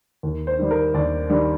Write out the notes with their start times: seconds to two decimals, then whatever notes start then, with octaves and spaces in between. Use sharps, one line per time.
0.23 D#2
0.47 C5
0.59 D#3 G3
0.71 A#4
0.94 D#2 D5
1.30 D#3 G3